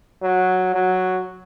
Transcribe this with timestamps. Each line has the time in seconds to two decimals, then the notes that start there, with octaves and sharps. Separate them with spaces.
0.22 F#3
0.74 F#3